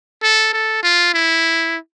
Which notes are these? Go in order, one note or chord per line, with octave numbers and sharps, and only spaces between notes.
A4
A4
F4
E4